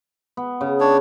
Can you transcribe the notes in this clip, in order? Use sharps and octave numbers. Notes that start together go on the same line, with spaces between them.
B3
C#3
D4 C#5